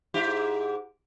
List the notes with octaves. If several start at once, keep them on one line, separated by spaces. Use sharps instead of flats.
G#2 E4 G4